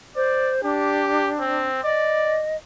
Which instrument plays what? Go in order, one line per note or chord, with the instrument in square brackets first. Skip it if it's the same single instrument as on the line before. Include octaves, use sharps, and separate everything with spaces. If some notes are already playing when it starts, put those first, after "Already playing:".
[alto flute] C5 [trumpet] D5
[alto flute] D4 [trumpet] G4
[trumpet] C4
[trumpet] D5 [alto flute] D#5